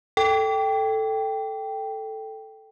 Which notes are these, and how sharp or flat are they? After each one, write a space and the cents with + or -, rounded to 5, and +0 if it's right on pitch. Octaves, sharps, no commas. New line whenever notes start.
A4 +0 G5 +0